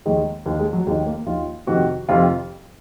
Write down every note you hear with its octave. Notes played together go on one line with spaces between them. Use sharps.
D#2 D#3 G#3
D#2 D#3 A#3
G#3
F#3
D#2 D#3 G#3
A#3
D#2 D#3 F4
F2 C3 D#3 F#4
F2 C3 D#3 F4